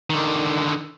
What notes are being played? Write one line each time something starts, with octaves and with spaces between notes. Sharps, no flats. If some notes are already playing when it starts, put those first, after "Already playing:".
D3 D#3